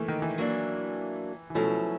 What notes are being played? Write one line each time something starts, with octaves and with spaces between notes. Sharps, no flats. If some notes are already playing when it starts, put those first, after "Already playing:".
Already playing: E3 A3 A#3
D#3
E3
F#3 A#3 D4
E3
B2 F3 F#3 A3 C#4 E4